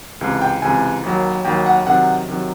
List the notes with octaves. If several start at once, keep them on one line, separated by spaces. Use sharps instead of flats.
C#2 C3 E3
G5
C#2 C3 E3 G#5
D#2 D#3 F#3
D#2 D#3 F#3 G5
F#5
C3 D#3 F#3 F#5
C3 D#3 F#3